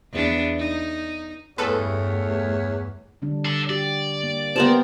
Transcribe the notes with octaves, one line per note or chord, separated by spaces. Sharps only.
E2 B3 D4
D#4
E2 G2 A3 A4 B4 C#5
D3 G3 D4
A4 D5
F#4 G4 D5
A#3
B3 G4 A#4 C5 A5